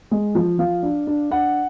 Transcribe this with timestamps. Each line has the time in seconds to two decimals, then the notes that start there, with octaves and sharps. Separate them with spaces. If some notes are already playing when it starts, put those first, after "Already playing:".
0.11 G#3
0.35 F3
0.59 F3 F5
0.83 D4
1.07 D4
1.31 D4 F#5